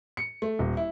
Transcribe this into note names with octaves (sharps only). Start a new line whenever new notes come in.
C#7
A3
D#1
E4